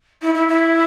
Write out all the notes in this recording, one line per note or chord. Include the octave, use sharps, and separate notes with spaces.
E4
E4
E4